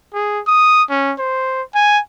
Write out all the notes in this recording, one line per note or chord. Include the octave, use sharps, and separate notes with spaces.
G#4
D#6
C#4
C5
G#5